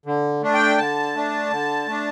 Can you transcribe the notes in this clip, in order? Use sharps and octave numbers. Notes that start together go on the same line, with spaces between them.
D3
A3 D4
G5
D3 A5
A3 D4
D3
A3 D4